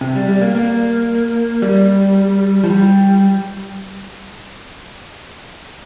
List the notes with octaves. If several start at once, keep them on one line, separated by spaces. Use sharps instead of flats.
C3
G3
G3
A#3
A#3
G3
F3
G3